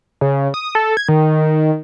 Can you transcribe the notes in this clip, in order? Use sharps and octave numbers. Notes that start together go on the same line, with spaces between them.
C#3
D#6
A4
G#6
D#3